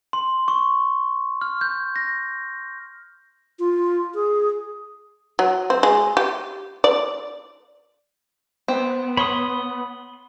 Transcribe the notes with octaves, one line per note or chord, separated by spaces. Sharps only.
C6
C#6
F6
G6
A#6
F4
G#4
F#3
C4
G#3
G4
D5
B3 C4
C#5 B5 C6 D#6